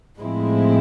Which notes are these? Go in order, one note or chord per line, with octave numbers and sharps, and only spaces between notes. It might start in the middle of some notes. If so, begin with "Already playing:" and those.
A2 F3 G#3 C4 E4